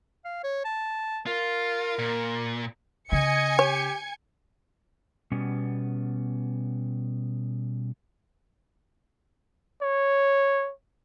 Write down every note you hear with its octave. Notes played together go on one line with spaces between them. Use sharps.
F5
C#5
A5
F4 A#4
A#2
C#3 D#5 G#5 G#6 C#7
G4 C#5
B2 G3 B3 C#4
C#5